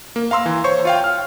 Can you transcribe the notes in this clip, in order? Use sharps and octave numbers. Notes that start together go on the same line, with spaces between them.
A#3
F5 A#5 C6 E6
E3
C5 C#5 C#6
F4 F5 G5
F6